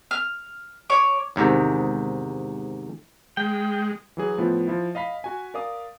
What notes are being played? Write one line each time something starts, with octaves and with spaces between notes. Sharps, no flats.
F6
C#5 D6
E2 G#2 C3 D#3
G#3 G5
E3 F#3 G#4
A2 F3 B3 E4 F4
F3 E4
D#5 F5 B5 B6
F#4 G#5
A#4 D5 F5 D6 D#6